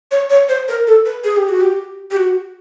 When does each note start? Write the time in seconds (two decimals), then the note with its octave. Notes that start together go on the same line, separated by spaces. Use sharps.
0.11 C#5
0.30 C#5
0.49 C5
0.68 A#4
0.87 A4
1.06 B4
1.24 G#4
1.37 G4
1.49 F#4
1.61 G4
2.11 G4
2.17 F#4